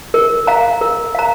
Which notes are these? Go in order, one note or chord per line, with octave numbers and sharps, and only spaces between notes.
A#4
F5 A#5
A#4
F5 A#5